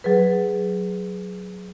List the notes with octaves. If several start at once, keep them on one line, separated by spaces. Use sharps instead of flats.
F#3 G#4 B4